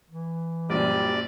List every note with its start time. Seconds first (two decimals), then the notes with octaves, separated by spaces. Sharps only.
0.10 E3
0.70 A#1 F#2 G3 D5